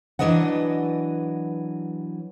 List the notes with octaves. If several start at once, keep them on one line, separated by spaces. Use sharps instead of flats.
E3 F#3 D4 B4 D#5 F#5